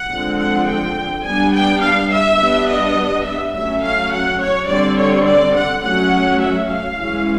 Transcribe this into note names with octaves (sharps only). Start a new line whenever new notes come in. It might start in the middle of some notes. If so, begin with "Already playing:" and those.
Already playing: F#5
D3 F3 G#3 C4
F#5
G5
G3 B3 D4 G#5
G5
F5
E5
G3 B3 D4
D#5
E5
F#3 A3 C#4 E5
F5
F#5
C#5
D3 G3 C4 D5
C#5
D5
F#5
F#3 A3 C#4 F#5
E5
F5
E3 G#3 C#4